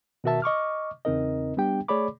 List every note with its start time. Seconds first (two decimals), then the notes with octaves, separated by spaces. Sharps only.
0.24 B2 D#3 F#4 A#4 E5 A5
0.42 D#5 C#6 D6 F6
1.05 E2 C#3 C4 D#4 A#4 D#5
1.57 G3 B3 D4 G4 G5
1.88 A3 G#4 C#5 D5 B5 D6